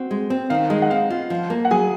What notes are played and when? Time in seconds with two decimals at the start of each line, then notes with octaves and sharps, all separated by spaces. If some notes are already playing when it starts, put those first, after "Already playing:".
Already playing: C4 F#4
0.11 G#3
0.30 C4
0.50 D#3 F5
0.70 G#3 D#5
0.82 F#5
0.90 C4 F5
1.10 F4
1.30 F3
1.50 A#3
1.65 F#5
1.71 F#3 G#4 G#5